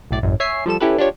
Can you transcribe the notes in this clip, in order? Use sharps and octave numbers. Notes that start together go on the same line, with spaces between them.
B1 A2 D5
A1 F#2
C#5 E5 G#5 C7
F3 G3 A4 E7
C#4 E4 G4 A4 B4
D4 F4 G4 C#5